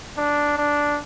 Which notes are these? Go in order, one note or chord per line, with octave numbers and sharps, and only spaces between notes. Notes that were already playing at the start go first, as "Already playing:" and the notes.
D4
D4